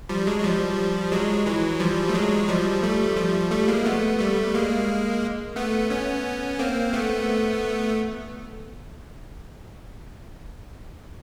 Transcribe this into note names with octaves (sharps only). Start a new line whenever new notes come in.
F3 G3
F#3 G#3
F#3
F3 G3
F#3 G#3
E3 F#3
F3 G3
A3
F#3 G#3
F3 G3
G3 A3
F3 G3
G3 A3
G#3 A#3
A3 B3
G3 A3
G#3 A#3
A3 B3
B3 C#4
A#3 C4
A3 B3